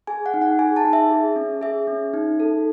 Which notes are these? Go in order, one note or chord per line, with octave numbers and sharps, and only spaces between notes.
G#4 G#5
F#5
D#4
F#5
G#4 G#5
A5
D#4
E5
G#4
C#4
G#4 E5
C#4
D#4
A4